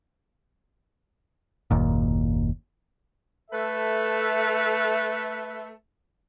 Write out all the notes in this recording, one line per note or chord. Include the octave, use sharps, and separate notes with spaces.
F#1 D#2 A#2
A3 A4 B4 E5